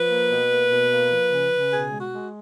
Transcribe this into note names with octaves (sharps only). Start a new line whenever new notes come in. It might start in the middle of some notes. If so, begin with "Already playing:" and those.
Already playing: F3 B4
A#3
B2
A#3
B2
A#3
F3
C#3
C#3
B2 G#4
G#3
F#4
G#3